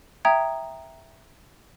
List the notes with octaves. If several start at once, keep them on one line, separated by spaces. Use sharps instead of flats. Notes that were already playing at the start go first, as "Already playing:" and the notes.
E5 G5 A#5 D#6 G#6